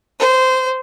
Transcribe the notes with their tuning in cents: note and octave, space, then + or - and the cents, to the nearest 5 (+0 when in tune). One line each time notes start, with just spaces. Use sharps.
C5 -15